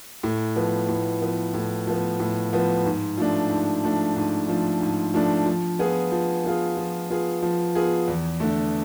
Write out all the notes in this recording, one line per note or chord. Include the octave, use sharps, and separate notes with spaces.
A2
F3 B3
A2
F3 B3
A2
F3 B3
A2
F3 B3
G#2
F3 A3 D4
G#2
F3 A3 D4
G#2
F3 A3 D4
G#2
F3 A3 D4
F3
B3 F4 G#4
F3
B3 F4 G#4
F3
B3 F4 G#4
F3
B3 F4 G#4
E2
D3 A3